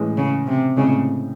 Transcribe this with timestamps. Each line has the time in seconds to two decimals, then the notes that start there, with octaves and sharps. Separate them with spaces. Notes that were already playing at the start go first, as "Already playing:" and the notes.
Already playing: A2 E3 G#3 C#4
0.17 C#3
0.47 C3
0.77 A2 C#3 G#3 C4 D#4